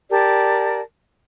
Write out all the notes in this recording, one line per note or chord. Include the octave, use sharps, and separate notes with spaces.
G4 A#4 D5 A5